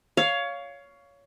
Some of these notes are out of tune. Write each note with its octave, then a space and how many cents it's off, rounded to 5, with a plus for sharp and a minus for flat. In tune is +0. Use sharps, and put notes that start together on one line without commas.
C#5 +20 F5 +0